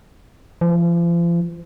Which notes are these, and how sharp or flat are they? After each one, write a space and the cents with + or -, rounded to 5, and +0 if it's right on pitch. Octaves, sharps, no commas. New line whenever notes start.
F3 -40